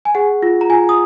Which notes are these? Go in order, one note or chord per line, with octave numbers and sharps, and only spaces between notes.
G#5
G#4 F#5
F4
A#5
F4 G#5
D#6